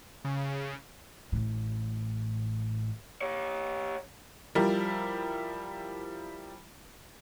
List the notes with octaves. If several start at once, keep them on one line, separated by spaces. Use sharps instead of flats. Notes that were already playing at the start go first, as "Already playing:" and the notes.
C#3
A1 A2
G4 C#5
F3 G3 E4 A#4